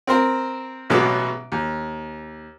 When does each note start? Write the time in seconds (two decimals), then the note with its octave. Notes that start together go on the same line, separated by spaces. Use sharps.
0.07 C4 A#4 C5
0.90 A1 B2 F#3 G#3 B3 D6
1.52 D#2